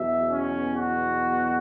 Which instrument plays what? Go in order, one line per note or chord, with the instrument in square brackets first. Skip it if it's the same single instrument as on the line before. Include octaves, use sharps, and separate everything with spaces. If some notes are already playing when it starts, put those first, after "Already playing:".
Already playing: [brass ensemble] E2 B2 F#3 E5
C#4
F#4